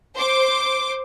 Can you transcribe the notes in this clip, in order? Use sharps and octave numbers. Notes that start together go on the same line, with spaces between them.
C5 D6